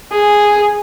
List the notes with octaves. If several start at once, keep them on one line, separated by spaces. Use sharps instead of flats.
G#4